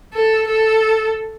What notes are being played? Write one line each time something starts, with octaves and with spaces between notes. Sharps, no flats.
A4
A4